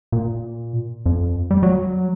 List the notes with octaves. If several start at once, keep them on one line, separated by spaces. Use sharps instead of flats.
A#2
F2
G3
F#3